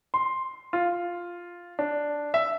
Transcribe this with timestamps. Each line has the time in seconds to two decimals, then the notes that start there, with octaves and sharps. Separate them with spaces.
0.14 C6
0.73 F4
1.79 D4
2.34 E5